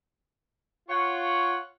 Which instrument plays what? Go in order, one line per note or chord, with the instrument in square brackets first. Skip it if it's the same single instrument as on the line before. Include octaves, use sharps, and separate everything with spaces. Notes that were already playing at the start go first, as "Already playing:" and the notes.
[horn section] F4 C#5 F#5